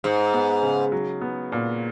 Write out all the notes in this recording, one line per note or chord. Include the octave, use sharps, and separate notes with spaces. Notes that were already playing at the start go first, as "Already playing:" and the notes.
G#2 G#3
B3
C#3
F#3
B3
A#2